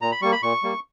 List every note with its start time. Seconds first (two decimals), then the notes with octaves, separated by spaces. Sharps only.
0.02 A#2 A#5
0.12 B5
0.22 G3 A#3 C#6
0.32 B5
0.43 A#2 C#6
0.63 G3 A#3